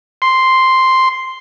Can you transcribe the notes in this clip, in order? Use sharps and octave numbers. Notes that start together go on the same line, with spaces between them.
C6